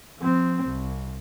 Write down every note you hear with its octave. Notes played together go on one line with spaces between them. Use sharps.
F3 C4
C2